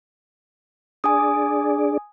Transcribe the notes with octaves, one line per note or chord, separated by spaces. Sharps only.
D4 G#4 D5 G#5 D#6